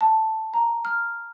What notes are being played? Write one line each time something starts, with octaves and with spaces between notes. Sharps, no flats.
A5
A#5
F6